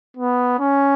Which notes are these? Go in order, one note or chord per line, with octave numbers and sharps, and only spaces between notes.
B3
C#4